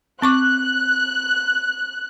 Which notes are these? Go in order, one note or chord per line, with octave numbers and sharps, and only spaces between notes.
C4 C#6 D6 F#6